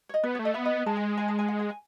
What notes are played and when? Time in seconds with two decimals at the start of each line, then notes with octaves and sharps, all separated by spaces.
0.09 C#5
0.14 D#5
0.23 B3 B4
0.35 A3 C#5
0.45 D#5
0.54 B3 E5
0.65 D#5
0.86 G#3 A5
0.97 G#5
1.18 G#5
1.28 A5
1.39 G#5
1.48 F#5
1.59 D#5
1.70 G#5